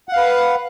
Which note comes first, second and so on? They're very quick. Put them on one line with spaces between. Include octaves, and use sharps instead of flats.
F#5 F5 B4